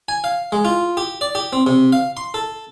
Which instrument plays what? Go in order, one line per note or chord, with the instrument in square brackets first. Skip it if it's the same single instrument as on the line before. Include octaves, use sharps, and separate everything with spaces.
[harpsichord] G#5
F5
G#3
F4
G4
D5
G4
C4
C3
F5
C6
A4